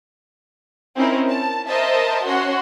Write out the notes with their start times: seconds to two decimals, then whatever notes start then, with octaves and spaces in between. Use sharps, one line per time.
0.96 C4 C#4 D#4 E4 A#4
1.28 A5
1.66 A#4 C5 D#5 E5 A5
2.26 C#4 F#4 C#5 F#5 C6